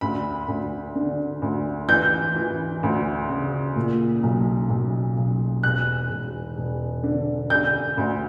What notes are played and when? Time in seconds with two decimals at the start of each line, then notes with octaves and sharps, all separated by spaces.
0.01 D2 B5
0.48 D2
0.95 D3
1.42 D2
1.88 E3 G6
2.36 E3
2.83 D2
3.29 C#3
3.76 A#2
4.23 B1
4.70 B1
5.17 B1
5.63 E1 F#6
6.10 E1
6.57 E1
7.03 D3
7.50 D3 G6
7.98 D2